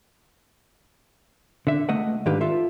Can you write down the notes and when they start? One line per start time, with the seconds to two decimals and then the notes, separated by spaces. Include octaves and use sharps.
1.67 D3 E5
1.89 C#2 A3 D#5 F#5
2.26 G#2 D3 D#3 G4 B4 F5
2.41 F4 A4 E5